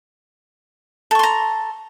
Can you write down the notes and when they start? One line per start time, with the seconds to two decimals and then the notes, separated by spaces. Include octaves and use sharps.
1.11 A4
1.15 C#6
1.19 C6
1.23 A#5